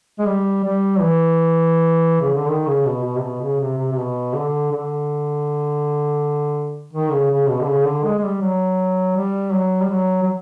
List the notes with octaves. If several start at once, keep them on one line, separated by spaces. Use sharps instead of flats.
G#3
G3
G3
E3
C#3
D3
D#3
C#3
B2
B2
C3
B2
C#3
C3
C3
C3
B2
D3
D3
D#3
C#3
C#3
B2
D3
C#3
D3
G#3
G#3
G3
F#3
G3
F#3
G3
F#3
F#3